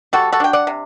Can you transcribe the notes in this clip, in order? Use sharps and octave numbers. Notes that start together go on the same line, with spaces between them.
G3 F#4 A4
F#4 A4
D4 G5
D5 F#5
C3